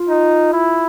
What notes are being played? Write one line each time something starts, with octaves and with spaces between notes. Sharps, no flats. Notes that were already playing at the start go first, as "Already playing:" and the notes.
Already playing: F4
D#4
E4